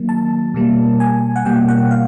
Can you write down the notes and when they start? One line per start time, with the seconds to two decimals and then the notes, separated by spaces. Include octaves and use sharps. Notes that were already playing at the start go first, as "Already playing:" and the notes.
Already playing: D#3 F#3 A#3
0.09 A5
0.54 B2 G3 A#3
1.00 G#5
1.36 F#5
1.45 B2 G3 A#3 G5
1.69 F#5
1.91 F5